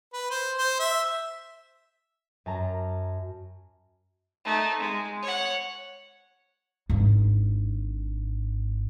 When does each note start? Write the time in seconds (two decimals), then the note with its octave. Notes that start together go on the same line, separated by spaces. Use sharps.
0.13 B4
0.30 C5
0.58 C5
0.80 E5
2.46 F#2 A5 A#5
4.45 A3 D#4
4.80 G#3
5.23 C#5 F#5
6.89 G#1 D4